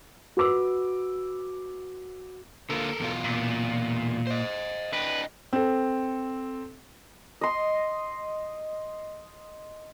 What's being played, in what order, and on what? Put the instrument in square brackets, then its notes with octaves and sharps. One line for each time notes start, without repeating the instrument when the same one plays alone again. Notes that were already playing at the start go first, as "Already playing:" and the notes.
[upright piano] F#4 B4 D6 E6
[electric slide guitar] D3 A#3 F4 [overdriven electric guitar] A4 A#4
[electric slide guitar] E2 B2 F4
[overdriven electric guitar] A#2
[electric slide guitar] C5 D#5
[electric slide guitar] D4 D#5 G5 [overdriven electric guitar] B4
[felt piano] C4 A4
[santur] D#5 C6